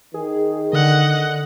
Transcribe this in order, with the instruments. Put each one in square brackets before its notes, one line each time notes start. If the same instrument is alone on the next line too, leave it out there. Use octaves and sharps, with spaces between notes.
[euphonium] D#3 [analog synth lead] G#4
[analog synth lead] D3 [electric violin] D#5 F#5